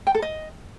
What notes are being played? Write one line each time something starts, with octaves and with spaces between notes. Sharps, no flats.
G5
A4
D#5